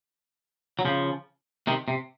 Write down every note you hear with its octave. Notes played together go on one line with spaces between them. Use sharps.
F#3
C#3 F3
C3 D#3
C3